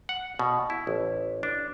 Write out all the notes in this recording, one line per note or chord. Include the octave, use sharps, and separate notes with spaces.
F#5
B2
E4
A1
D4